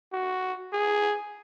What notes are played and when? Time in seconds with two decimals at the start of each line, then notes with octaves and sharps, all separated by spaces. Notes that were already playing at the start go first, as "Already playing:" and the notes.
0.13 F#4
0.73 G#4